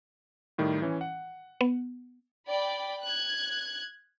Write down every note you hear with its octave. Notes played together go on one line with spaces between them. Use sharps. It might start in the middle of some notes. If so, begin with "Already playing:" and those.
A2 D#3 G3
E3 C#4
F#5
B3
D5 G5 B5
F#6 G#6